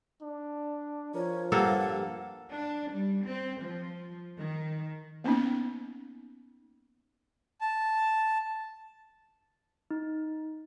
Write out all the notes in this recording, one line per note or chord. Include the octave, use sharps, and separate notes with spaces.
D4
F3 A#4 C#5
G2 A#3 A4 F#5
D4
G3
C4
F3
D#3
A#3 B3 C#4 D#4
A5
D#4